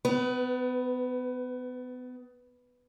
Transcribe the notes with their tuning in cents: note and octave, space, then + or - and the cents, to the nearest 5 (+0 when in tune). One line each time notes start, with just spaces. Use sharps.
B3 +30 B4 +0